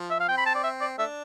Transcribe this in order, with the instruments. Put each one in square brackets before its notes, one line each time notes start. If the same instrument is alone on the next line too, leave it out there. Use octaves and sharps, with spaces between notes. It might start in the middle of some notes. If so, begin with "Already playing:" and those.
Already playing: [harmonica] F3
[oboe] E5
F5
[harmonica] C4 [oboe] G5
[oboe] B5
A5
D5
E5
D5
[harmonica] A3 D4 [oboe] E5